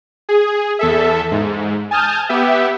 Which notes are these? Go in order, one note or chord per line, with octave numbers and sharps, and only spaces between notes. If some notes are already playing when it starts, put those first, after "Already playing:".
G#4
E2 A4 E5
G#2
G#5 A5 D#6 F6 G6
B3 G4 E5